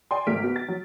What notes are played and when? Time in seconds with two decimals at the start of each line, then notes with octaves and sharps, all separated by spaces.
0.11 D5 G5 G#5 C6
0.27 G#1 A3 A#4 F6 B6 D7
0.43 B3 F#4
0.56 A6
0.68 F#3